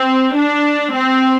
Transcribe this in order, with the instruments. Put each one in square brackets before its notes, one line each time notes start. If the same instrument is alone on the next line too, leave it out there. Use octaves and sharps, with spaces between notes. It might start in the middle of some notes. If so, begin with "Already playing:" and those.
Already playing: [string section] C4
D4
C4